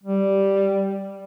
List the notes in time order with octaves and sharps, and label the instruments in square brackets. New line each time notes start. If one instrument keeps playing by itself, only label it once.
[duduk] G3